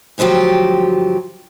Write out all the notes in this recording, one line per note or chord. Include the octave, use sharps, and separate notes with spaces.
D2 G2 F3 F#3 G4